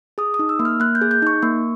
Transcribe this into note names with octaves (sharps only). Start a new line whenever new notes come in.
G#4 D#6
D#6
D#4
E6
A#3
F6
A#3 F#6
G6
G#4
G6
D#4 C#6
A#3